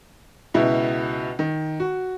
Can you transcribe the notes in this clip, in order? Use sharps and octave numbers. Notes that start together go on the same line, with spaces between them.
C#2 B2 E4
D#3
F#4